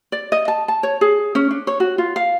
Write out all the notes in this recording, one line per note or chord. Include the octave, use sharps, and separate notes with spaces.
D5
D#5
A5
A5
C#5
G#4
C#4
D4
C#5
F#4
F4
F5